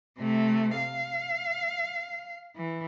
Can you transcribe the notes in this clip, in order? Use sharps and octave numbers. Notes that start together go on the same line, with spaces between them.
C3 A3
F5
E3